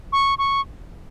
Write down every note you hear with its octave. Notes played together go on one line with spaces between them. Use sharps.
C#6
C#6